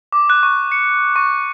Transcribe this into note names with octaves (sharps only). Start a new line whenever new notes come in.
D6
F#6
C#6
C#7
C#6